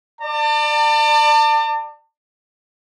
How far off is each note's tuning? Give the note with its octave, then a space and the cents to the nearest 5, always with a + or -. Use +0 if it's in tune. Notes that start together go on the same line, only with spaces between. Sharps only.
D5 +25 A5 +40